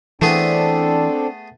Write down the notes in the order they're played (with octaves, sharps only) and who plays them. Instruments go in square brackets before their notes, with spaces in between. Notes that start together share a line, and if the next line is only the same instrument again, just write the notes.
[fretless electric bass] E3 [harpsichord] A3 B3 G#4 [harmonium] C4 D4 A4